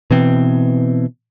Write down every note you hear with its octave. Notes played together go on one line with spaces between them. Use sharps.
B2 E3 C4